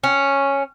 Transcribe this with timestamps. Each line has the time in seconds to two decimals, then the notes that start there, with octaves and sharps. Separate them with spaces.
0.04 C#4